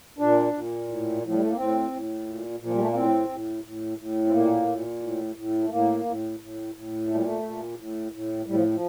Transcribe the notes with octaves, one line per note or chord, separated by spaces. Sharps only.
A#2 D4
A#2
A2
A2 F3
G3
A3
A#3
A2 C4
A2
A#2
A#2
F3
G3
A3
A#3
A2 C4
A2
A2
A2
C4
A#2 A#3
A#2
A2
A2
A3
A2 A#3
A2
A2
A2
A#2 A3
G3
A3
A#2
A2
A2
A2 G3
F3
F3